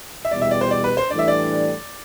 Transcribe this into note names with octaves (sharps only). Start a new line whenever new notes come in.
E5
E2 B2 G3 D5
E5
D5
C5
D5
B4
C5
A2 E3 G3 D4 D5
E5
D5